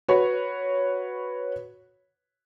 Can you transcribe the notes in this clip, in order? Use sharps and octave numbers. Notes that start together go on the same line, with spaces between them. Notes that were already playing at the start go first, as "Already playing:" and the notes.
F#4 B4 C#5